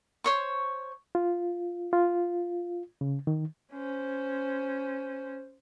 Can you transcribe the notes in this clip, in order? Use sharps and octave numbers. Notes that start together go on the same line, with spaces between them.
C5 C#5 C#6
F4
F4
C#3
D#3
C#4 C5